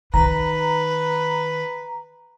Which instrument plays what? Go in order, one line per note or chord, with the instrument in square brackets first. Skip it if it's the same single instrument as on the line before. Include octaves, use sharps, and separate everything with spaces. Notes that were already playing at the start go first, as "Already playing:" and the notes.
[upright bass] D#3 [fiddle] B4 [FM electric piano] A#5